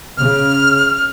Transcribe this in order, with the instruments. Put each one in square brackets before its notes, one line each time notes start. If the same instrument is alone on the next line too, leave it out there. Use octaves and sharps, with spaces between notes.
[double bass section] C#3 [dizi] F6